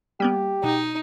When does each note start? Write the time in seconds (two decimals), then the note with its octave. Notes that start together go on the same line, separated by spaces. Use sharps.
0.20 G3 A#3 B3 G4
0.64 B2 D#4